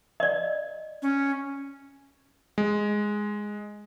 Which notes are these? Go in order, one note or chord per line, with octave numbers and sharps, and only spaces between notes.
D5 D#5
C#4
G#3